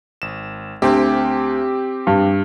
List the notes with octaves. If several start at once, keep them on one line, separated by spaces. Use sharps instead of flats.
G#1 E7
D2 C4 G4
G2